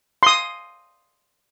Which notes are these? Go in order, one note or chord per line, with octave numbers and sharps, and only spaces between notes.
C6 D#6